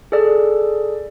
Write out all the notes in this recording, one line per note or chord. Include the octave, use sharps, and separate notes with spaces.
G#4 A4 D5